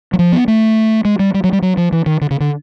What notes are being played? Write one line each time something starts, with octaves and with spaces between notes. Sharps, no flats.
F#3
F3
B3
A3
G#3
G3
G3
F#3
G3
F#3
F3
E3
D#3
D3
C#3
D3